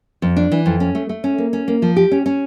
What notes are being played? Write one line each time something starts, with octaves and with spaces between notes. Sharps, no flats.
F2
D4
E3
F2
C#4
A3
A3
C#4
A#3
C#4
A#3
F3
G4
C#4
C#4